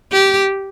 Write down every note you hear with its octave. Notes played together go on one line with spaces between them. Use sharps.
G4